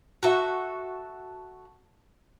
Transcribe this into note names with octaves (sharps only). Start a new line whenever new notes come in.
F#4 A4 E5